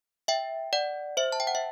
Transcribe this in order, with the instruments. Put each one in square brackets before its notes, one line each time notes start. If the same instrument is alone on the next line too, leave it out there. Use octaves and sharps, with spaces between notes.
[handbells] E5 G5
D5 F#5
C5 E5
A5
G5
F#5
E5